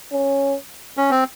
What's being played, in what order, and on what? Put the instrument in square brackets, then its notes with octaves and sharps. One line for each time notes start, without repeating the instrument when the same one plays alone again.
[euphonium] C#4
[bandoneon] C#4
C4